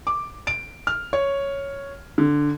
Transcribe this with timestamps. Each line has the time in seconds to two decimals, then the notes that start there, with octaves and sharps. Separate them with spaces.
0.07 D6
0.47 D7
0.87 F6
1.13 C#5
2.18 D3